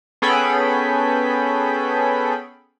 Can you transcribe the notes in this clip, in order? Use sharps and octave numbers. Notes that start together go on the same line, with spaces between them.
B3 C#4 G#4 A4 G5 B5